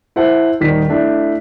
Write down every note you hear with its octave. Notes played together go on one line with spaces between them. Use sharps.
E4 C5 F#5 A5
D#1 D#3 G3 B6
A3 D4 E4